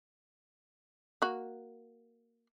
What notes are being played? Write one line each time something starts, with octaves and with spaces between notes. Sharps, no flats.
A#3 F#4